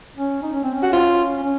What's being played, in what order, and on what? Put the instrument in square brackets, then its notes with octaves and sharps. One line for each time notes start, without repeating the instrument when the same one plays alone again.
[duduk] C#4
D#4
C#4
C4
C#4
[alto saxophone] F#4
F4
[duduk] C#4